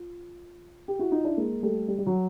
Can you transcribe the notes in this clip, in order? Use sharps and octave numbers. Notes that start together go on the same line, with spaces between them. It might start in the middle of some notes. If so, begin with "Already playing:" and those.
Already playing: F4
G4
E4 F#4
D#4 F4
D4 E4
G#3 A#3
G3 A3
G3
G3
F#3